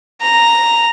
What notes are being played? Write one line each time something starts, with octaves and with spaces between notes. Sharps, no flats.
A#5